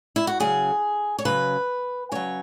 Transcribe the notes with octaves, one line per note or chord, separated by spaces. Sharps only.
E4
F#4
C#3 F#3 G#4
C#5
C#3 F#3 B4
C#3 F#3 C#5